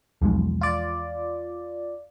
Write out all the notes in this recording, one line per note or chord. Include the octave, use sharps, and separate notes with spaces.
B1 E2 F3 G#3
F4 D5